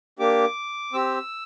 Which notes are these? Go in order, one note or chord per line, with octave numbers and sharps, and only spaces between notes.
A#3 D4 G4 D6
C4 G4 E6